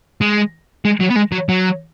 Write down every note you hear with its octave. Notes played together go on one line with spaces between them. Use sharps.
G#3
G#3
F#3
B3
G#3
F#3
F#3